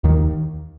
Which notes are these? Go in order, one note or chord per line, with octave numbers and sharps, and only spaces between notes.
D#2 D#3